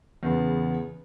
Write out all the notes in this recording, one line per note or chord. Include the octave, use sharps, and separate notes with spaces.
E2 C#3 B3